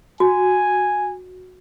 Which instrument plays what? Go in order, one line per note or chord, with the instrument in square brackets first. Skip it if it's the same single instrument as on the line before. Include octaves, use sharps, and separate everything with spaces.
[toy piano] F#4 [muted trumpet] G#5